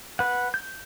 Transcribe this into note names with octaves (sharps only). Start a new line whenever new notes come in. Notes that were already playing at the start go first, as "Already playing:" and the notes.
B4 F#5
G6